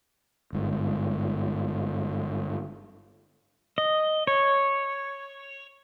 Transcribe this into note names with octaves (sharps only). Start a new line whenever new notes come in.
G1 G#2
D#5
C#5